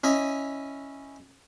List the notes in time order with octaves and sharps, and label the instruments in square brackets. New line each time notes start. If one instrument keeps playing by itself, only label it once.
[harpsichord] C#4 E4 D#5 G#5